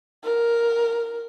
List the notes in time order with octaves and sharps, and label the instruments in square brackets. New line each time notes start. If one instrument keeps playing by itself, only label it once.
[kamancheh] A#4